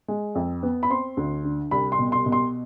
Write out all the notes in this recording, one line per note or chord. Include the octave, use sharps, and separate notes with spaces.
G#3
F2
B3
B5
C4 C6
D2
D3
C2 B5
C6
B2
C6
B2
C6